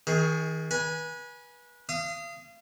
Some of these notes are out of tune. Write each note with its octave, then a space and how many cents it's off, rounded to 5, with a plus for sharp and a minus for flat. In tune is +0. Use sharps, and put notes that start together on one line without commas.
D#3 +35 G#4 +0
B4 -30 G#5 +0
F5 -35 D#6 +0